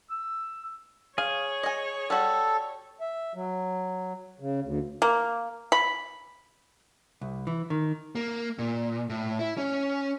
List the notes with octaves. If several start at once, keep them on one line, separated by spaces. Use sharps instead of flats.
E6
G#4 C#5 F5
D#5 G#5
G3 F#4 A4
E5
F#3
C#3
D2
A#3
B5
C2
E3
D#3
A#3
A#2
A2
E4
C#4